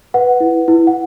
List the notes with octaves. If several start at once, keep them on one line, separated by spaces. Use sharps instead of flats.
B4 F#5
E4
E4
F#5